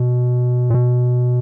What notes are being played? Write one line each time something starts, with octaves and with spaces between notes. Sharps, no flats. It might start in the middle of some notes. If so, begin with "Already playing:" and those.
Already playing: B2
A#2
B2